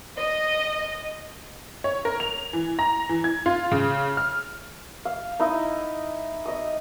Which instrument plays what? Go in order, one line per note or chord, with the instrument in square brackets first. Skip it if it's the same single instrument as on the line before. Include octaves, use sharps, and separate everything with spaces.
[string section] D#5
[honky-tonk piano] C#5
A#4
F7
E3
A#5
E3
G#6
F4
C#3
F6
[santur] F5
D#4 E4 D#5
D#5 D#6